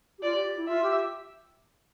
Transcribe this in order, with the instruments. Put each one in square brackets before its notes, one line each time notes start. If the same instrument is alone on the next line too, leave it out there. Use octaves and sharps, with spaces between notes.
[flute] G4
[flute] F4 [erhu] D5
[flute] G4
E4
[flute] F4 [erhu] E5
[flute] G4